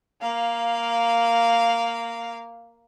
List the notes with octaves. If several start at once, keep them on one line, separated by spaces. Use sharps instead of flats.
A#3 F5